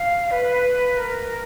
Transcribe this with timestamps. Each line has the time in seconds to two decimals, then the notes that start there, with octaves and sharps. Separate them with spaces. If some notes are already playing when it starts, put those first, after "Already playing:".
Already playing: F5
0.31 B4
0.97 A#4